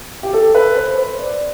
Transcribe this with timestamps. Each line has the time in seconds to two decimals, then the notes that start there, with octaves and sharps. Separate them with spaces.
0.23 G4
0.33 A4
0.55 B4
0.77 C5
0.98 C5
1.19 D5